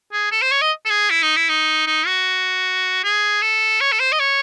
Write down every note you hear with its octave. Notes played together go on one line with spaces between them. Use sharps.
G#4
A4
C5
C#5
D#5
A4
G#4
E4
D#4
E4
D#4
D#4
F#4
G#4
A4
C#5
A4
C5
D#5
C#5